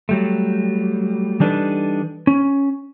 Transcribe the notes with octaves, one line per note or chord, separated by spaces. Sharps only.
F#3 G3 A3
E3 G3 D4 D#4 A4 B4
C#4